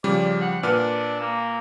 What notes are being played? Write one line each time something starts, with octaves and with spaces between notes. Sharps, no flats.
C#3 F3 G3 D5
F#5
A#2 D4 B4 F6
A#3